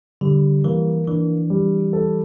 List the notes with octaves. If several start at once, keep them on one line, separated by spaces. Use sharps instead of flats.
D3 G3
E3 A#3
E3 D4
G3
A4